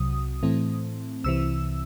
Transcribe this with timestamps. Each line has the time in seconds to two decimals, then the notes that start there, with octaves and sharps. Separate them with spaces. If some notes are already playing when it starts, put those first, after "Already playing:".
Already playing: C2 C3 F#3 D#6
0.43 A2 E3 A3 C4
1.24 C2 C3 E3 E6